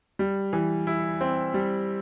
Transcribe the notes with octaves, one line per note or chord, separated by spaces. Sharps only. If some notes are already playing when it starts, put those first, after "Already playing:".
G3
E3
E4
C4
G3